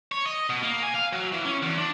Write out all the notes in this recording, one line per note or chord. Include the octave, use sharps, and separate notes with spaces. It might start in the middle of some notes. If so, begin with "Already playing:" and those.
C#5
D#5
B2
A#3
G#5
F5
F#3
E3
C#4
E2
D4